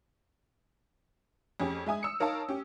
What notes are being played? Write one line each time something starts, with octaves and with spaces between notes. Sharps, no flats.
F2 C#4 G4 G#4
G#3 E5 G#5 D#6
E6 C#7
D#4 A#4 C#5 F5 A5
C#4 G4